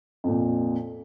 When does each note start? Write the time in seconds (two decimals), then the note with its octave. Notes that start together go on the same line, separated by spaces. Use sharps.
0.24 F2 A#2